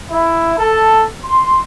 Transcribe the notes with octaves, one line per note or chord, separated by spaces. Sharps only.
E4
A4
C6